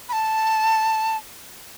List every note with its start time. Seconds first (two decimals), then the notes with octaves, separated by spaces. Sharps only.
0.09 B5
0.13 A5